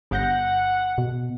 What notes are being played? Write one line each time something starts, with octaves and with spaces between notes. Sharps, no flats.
G1 F#5 G6 A#6
B2